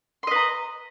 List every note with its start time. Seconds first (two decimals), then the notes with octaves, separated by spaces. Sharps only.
0.23 C6
0.27 D#5
0.31 B4
0.35 A#5